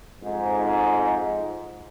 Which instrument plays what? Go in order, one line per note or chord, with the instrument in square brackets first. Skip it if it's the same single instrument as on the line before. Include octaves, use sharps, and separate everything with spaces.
[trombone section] F2 G#2